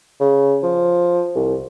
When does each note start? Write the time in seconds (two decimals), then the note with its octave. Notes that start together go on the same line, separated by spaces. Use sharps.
0.20 C#3
0.63 F3
1.35 C2